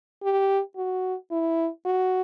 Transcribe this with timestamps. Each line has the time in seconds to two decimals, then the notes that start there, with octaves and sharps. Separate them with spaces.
0.23 G4
0.76 F#4
1.31 E4
1.85 F#4